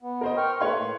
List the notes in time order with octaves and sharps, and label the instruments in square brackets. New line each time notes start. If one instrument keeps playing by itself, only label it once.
[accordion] B3
[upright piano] A#4 C5 D#5
[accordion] G5 C#6 F6
[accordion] A3 A#3 [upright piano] B4 C#5 C6
[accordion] A2